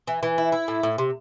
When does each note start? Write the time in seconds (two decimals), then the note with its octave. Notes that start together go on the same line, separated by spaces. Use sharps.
0.07 E3
0.23 E3
0.38 E4
0.52 E4
0.68 A2
0.83 A2
0.98 C3